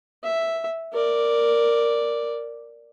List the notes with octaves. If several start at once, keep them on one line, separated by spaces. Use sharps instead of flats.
E5
A#4 D5